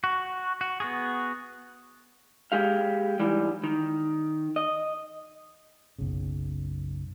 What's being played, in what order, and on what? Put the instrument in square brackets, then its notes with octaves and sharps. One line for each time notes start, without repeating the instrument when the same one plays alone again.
[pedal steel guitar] F#4
F#4
B3 F#4 G#4
[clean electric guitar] G#3 G4 F5
G#2 E3 G3
D#3
D#5
[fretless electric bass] F#1 B1 C#3